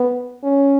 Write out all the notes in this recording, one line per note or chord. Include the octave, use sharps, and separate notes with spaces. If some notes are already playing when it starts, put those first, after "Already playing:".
Already playing: B3
C#4